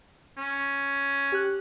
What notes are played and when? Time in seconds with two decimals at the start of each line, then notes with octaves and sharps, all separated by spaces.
0.37 C#4
1.32 G4 F#6